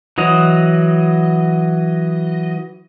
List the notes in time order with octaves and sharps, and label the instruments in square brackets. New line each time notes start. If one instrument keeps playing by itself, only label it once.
[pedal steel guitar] E3 F#3 D#5